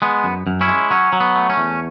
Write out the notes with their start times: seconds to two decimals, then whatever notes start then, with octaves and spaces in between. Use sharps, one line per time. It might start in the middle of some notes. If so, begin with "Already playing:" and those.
0.02 G#3 B3
0.24 F#2
0.47 F#2
0.61 C#4 E4
0.68 G#3
0.91 F#3 C#4
1.13 F#3
1.20 B3
1.35 A3
1.50 C#4
1.57 E2